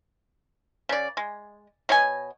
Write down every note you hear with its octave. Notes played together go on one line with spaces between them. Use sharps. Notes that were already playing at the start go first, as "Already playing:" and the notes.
C#3 D5
G#3
B2 C#5 D#5 G#5